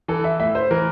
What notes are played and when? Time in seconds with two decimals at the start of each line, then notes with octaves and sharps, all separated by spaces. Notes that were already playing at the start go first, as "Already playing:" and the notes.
0.08 E3 A4
0.24 E5
0.39 A2 E5
0.55 C5
0.71 E3 A#4